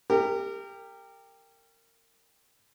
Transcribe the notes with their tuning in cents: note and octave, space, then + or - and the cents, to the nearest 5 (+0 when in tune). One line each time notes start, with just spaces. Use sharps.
G4 +15 A#4 -30